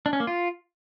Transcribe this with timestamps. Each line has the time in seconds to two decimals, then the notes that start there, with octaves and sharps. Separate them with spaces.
0.06 D4
0.13 C#4
0.20 A#3
0.27 F4